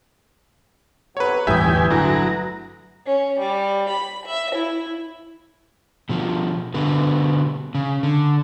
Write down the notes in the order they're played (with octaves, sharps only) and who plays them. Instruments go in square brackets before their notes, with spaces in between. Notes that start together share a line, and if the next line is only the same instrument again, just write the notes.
[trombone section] B1 C3 F#3 [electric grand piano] B4 C#5
[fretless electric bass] G1 A2 [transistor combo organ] E2 G4 G#5 [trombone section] E3 [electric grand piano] E5 D#6
[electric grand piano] D3 E4 [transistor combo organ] F#3 A#5
[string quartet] C#4
G3
B5
E5
E4
[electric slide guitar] B2 F3
B2 D3 B3
C#3
D3